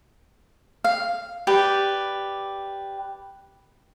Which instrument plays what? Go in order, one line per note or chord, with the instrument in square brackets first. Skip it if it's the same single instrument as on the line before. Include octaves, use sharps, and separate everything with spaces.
[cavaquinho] F5
G4 B4 D5